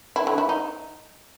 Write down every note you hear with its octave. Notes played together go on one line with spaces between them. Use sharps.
E4
D3
E4
D#4